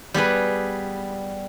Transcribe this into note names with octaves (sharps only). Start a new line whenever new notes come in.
G3 B3 G#4 B4